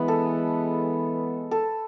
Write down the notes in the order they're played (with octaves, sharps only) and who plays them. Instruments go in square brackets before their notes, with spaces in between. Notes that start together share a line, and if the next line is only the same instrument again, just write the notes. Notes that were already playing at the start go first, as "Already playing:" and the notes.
Already playing: [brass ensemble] E3 G#3 B3 [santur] B4
[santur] A4
A4